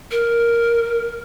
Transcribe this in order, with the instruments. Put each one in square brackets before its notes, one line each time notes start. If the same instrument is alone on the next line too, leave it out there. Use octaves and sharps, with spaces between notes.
[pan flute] A#4